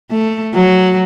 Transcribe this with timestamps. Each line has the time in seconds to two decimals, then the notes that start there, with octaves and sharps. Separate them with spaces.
0.11 A3
0.54 F#3